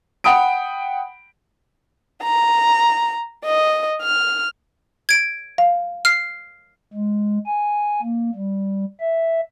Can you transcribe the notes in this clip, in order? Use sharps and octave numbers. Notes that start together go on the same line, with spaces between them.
F#5 G5 B5 D#6 D7
A#5
D#5
F6
G#6 D7
F5
F6 C7
G#3
G#5
A#3
G3
E5